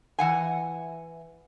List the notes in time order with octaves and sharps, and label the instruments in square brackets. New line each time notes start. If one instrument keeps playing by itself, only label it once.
[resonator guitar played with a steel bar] E3 F#5 G#5